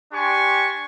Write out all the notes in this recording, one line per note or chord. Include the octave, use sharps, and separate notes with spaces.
D4 G4 G#5 C6 C#6